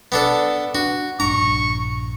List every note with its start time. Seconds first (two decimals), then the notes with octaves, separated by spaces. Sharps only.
0.12 B3 D4 A4
0.75 D4 F#4
1.20 A#1 G2 D4 A#5 C#6